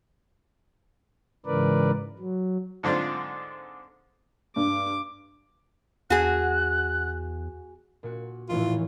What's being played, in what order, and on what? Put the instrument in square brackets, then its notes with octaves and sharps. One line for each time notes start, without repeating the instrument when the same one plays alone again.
[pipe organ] G#2 C#3 E3 A#4 B4 D5
F#3
[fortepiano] G#2 D3 C4 D4 F4
[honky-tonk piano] G2 [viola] D6
[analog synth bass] E2 [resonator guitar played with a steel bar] F#4 G#4 [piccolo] F#6
[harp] A#2 F#4
[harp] F1 C#5 [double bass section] A2 E3 [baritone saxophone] F4